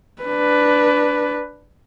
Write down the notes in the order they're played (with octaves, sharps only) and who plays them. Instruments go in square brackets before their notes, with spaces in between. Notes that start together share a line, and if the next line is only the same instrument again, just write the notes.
[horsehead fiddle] D4 B4